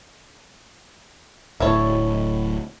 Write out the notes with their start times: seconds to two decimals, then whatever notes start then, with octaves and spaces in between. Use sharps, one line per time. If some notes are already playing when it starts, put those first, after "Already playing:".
1.60 D1 A2 E4 A4 C#5